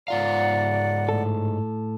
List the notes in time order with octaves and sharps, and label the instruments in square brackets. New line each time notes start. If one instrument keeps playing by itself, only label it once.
[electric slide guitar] G#2 F4 F5 [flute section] D5 F#5 A#5
[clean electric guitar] A2 A4